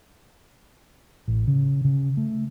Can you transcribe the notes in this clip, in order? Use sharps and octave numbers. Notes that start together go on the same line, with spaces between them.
A1
C#3
C#3
A3